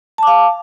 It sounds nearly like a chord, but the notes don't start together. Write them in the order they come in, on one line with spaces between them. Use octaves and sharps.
A5 D6 F5